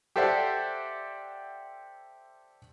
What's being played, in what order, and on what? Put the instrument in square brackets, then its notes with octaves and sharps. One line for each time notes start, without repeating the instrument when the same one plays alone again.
[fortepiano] G4 A4 C5 D5 E5 F#5